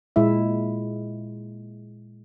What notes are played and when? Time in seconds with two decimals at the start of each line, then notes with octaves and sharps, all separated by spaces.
0.16 A#2 G#3 E4 E5